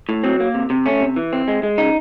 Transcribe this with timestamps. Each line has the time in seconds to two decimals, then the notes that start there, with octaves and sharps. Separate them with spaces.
0.09 A2
0.24 F#3 C4
0.40 A#3
0.54 C3
0.70 C3
0.86 A3 C#4
1.01 C3
1.16 E3
1.33 C4
1.48 G#3
1.63 G#3
1.78 C#3 D#4